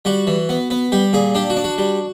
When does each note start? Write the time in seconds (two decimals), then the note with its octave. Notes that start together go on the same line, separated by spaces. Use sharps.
0.05 G3 F#4
0.27 E3
0.49 B3
0.70 B3
0.92 G3 G4
1.13 A#2 G#4
1.35 D4 G4
1.50 F#4
1.57 D4
1.64 F#4
1.78 G3